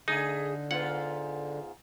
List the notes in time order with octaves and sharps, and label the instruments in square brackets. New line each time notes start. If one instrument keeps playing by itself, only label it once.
[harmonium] D3 [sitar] A3 G#4 [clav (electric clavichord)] D#4
[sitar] G#2 B3 F4 [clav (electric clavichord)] F#5